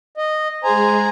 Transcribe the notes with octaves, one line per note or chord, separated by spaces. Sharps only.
D#5
G#3 G#4 C5 G#5 A#5